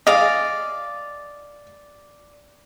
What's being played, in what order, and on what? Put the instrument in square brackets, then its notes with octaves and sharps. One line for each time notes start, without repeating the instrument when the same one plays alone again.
[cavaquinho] G#4 D5 F5 [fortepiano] D#5